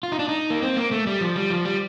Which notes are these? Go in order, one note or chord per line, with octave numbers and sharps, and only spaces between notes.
F4
D#4
D4
D#4
A#3
C4
A#3
A3
G3
F3
G3
F3
G3